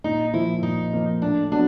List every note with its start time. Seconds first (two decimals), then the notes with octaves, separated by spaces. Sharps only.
0.04 A#2 D#4
0.34 F3 A#3 E4
0.62 A#2 D#4
0.93 F3 A#3
1.22 A2 D4
1.52 F#3 B3 D4